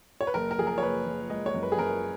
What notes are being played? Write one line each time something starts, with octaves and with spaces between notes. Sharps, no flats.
C#5
B4
F#1 A#4
A#4
F3 G#4
A#4
C#5
F#1 B4
F3
G#3 D#5
C#5
F#2
B4
G#4
F#2 A#4